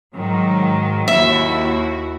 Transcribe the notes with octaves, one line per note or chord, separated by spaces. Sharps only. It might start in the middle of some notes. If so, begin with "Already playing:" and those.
G#2 D#3 F#3
D#2 E4 F#4 E5